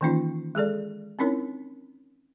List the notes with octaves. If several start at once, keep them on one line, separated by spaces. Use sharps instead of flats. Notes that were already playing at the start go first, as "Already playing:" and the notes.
D#3 E3 A#3 C#4 D#4 F4
G#3 G#4 A4 D5
C4 C#4 D#4 E4 A#4 C#5